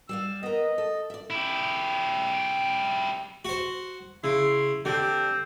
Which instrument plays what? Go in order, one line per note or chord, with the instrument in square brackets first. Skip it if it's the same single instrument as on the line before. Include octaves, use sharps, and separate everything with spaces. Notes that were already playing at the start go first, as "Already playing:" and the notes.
[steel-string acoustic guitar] G3 D5 F5 [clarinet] E6
[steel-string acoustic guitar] B3 A#4 [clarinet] D#5
[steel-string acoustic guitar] A4
D5 E5
[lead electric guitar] E4 G4
[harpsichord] F#4 C5
[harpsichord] C#3 [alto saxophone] E4 [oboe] C6
[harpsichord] D3 [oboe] C4 [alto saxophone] G4